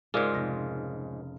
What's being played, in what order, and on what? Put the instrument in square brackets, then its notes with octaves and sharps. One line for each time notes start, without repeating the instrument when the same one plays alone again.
[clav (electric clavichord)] G#2 G#3 [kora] C#3 F4 [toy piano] G#4 A#4 D5
[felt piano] F1 A#6